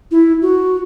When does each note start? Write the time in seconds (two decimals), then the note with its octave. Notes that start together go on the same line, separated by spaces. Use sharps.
0.11 E4
0.42 F#4